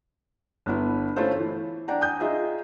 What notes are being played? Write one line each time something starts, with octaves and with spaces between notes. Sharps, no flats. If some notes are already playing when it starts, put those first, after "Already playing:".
G1 B3 E4
A3 C#4 E4 F4 A4 C5
E3
D4 D5 F#5 G5 A#5
G#5 D#6 G6
D#4 F4 G#4 D#5 E5